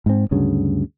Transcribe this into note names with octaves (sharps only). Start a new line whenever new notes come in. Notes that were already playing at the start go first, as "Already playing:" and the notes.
G#2 C4
D2 G2 C#3 F#3